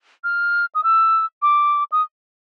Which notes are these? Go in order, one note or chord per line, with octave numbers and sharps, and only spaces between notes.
F6
D#6
E6
D6
D#6